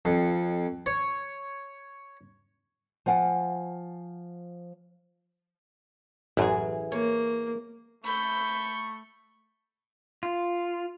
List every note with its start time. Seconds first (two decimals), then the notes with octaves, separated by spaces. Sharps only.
0.05 F2
0.86 C#5
3.06 F3 F5 F#5 G#5
6.37 A1 F#2 E3 G#4
6.92 A#3 C#5
8.04 A3 B5 C#6 G6
10.23 F4